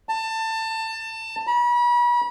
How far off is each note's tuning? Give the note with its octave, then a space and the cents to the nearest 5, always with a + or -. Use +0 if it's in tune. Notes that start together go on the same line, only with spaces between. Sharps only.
A5 +25
B5 -40